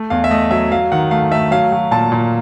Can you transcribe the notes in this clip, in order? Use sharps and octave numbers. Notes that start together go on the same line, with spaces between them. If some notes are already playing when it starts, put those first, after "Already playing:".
Already playing: A3
E2 F5
E5
A3 D#5
F#3 E5
F#3 F5
D#3 F#5
A3 F5
A3 E5
F#3 F5
F#3
A#2 A5
A#2